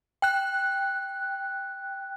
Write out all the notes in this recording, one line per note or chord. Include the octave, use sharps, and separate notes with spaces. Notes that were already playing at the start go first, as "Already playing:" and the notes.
G5 F#6